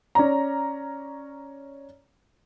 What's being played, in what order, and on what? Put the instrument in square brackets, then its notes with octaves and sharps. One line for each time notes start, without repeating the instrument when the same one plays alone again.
[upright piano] C#4 D5 A#5